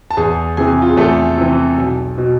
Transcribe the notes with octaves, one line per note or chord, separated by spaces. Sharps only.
A5
E2 G#4 G#5
C3 E3 G#4 G#5
F4
G#4
E2 A3 A4
C3 E3
B1
B2